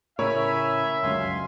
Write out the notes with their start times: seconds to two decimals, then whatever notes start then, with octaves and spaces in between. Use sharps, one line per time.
0.19 A2 C#3 A#4 C#5 E5 G#5 B5 E6
1.03 G1 C#2 F#2 F5 G#5 C6